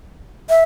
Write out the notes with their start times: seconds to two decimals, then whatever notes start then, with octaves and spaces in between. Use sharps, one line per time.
0.49 E5